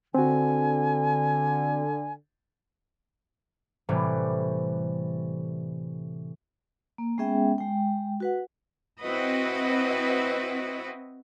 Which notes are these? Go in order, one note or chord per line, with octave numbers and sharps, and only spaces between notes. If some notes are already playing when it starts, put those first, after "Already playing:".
D3 C4 F#4 G#5
A2 C3 E3 G3 A3
A#3
G#3 B3 C#4 G#4 E5 G5
G#3 G5
F#4 B4 F#5
C4 E4 F#4 B4 D#5